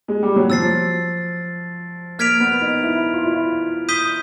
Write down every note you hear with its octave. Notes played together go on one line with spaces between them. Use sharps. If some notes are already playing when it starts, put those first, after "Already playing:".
G#3
G3
F#3
F3 E6 A6 C7
A#3 F6 G#6 B6 D7 F7
B3
D#4
E4
F4
E4
F4
D#6 G6 B6 D#7 G7